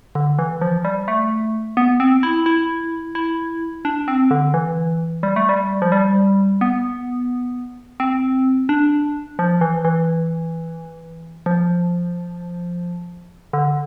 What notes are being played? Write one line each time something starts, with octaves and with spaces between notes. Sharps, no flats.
D3
E3
F3
G3
A3
B3
C4
E4
E4
E4
D4
C4
D3
E3
G3
A3
G3
F3
G3
B3
C4
D4
F3
E3
E3
F3
D3